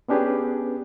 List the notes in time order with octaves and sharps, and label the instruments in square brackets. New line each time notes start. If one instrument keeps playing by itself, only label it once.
[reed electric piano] B3 C#4 D4 G4 G#4 B4